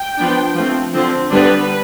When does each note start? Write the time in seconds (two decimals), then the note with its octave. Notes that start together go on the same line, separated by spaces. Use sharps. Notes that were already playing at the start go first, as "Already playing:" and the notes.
Already playing: G5
0.17 F3 B3 D4
0.56 F3 A3 C4
0.94 D3 F3 C4
1.31 D3 G3 B3 D4 B4